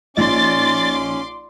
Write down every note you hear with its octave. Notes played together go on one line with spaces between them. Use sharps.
A#1 C#4 D#4 D5 C6 D6 A6